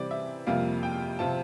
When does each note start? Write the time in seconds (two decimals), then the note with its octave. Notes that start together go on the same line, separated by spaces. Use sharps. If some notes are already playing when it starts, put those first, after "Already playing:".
Already playing: C3 E3 G3 C4 D5
0.11 E5
0.47 F2 C3 G3 A#3 F4 F5
0.83 G5
1.19 C3 F3 C4 F4 A5